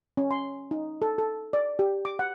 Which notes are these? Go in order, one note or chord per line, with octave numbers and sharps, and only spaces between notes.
C#4
C6
D#4
A4
A4
D5
G4
D6
F#5